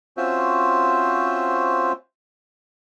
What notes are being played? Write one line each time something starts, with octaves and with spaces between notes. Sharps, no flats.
C4 C#4 F4 F#4 C5 E5